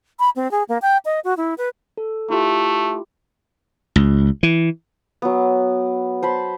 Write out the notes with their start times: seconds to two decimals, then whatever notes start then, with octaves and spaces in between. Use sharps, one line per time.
0.19 B5
0.36 C4
0.51 G#4
0.69 A#3
0.82 G5
1.05 D#5
1.24 F#4
1.37 E4
1.58 B4
1.98 A4
2.30 A3 E4 F4 G4
3.96 C#2
4.43 E3
5.22 F#3 B3
6.23 C5 A5 B5